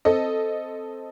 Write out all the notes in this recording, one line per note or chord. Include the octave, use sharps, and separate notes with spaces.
C4 A4 D#5